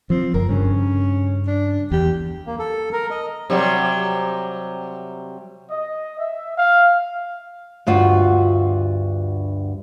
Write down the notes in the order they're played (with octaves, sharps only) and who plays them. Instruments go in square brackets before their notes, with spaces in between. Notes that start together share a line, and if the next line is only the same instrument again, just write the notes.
[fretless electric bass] F3 [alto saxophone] C4
[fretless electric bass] F#1 [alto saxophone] A#4
[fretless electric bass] G2 C#3 [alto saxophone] C#4
[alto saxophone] D4
[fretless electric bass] E2 [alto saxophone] G4
[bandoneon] A#3
A4
A#4
D#5
[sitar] C3 F#3 G3
[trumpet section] D#5
E5
F5
[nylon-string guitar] D2 G2 F4 F#4